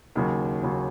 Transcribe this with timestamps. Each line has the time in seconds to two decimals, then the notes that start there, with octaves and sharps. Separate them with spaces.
0.15 D#2 C#3 F#3
0.63 D#2 C#3 F#3